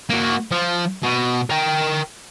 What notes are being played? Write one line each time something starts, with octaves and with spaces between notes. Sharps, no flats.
A#3 F#4
F3
B2
A#4 G5